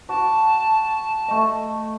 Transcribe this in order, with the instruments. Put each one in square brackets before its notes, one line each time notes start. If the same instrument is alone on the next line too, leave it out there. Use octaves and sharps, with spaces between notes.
[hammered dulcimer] F#4 D6 [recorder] A5
[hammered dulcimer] A3 D#5